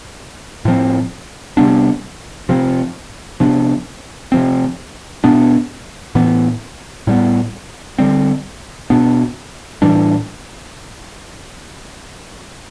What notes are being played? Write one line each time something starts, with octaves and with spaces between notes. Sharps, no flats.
A2 F3 C4
C3 G3 B3 D4
C3 F3 C4
C3 F3 B3 D4
C3 F3 C4
B2 B3 D4
A2 E3 B3
A2 G3 B3
D3 G3 C4
B2 B3 D4
A2 E3 G3 D4